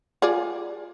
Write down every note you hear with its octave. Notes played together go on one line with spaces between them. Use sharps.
F4 G#4 D5